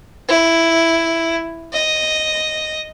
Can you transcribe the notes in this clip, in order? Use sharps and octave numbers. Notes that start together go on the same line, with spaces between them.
E4
D#5